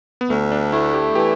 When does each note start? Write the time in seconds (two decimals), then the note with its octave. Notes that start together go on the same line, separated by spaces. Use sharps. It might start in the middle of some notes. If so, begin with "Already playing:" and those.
0.21 B3
0.29 D2 A3
0.52 D4
0.72 A3 E4
0.94 G4
1.15 E3 G4